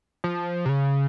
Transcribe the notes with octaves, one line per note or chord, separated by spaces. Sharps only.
F3
C3
C#3